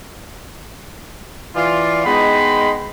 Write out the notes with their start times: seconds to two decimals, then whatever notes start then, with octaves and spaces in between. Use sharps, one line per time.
1.56 E3 F4 D5
2.06 G#3 B3 D#4 G5 B5 C6